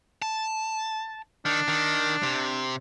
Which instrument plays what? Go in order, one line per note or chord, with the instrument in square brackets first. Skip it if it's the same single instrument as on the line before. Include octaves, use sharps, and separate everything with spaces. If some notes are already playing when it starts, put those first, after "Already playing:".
[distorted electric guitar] A5
[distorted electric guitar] D#3 [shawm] D4
[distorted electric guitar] D#3
C3